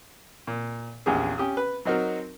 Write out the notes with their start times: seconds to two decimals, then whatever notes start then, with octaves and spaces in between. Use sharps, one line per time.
0.47 A#2
1.06 A#1 E2 C#4 G4 G#4
1.38 C#4 G4 D#6
1.57 B4
1.85 F#3 C4 D#4 F#4 A#4